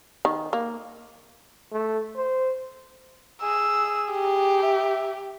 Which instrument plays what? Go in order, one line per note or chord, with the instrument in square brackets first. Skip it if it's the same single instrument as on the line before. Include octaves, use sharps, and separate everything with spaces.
[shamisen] D#3
A#3
[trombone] A3
C5
[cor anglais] G#4 [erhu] E6
[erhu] G4
[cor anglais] E5